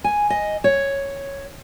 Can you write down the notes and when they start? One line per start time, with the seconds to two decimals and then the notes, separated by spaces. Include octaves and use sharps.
0.04 G#5
0.30 D#5
0.64 C#5